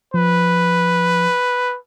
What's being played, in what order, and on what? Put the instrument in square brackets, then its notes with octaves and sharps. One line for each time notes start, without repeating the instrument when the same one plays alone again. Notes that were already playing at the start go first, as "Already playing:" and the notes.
[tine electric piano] F3 [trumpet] B4